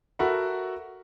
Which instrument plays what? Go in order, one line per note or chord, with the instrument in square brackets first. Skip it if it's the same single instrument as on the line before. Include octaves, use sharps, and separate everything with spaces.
[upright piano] F#4 A4 A#4 E5 F#5 B5